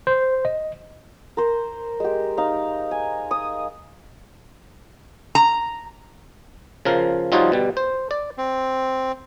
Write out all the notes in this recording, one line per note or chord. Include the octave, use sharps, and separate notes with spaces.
C5
D#5
A#4 C5
G#3 G4
D#4 F5
G#5
D#6
A#5
C#3 F3 A#4
F3 G3 D#4 F4 F#4 C#5
B2 G3
C5
D5
C4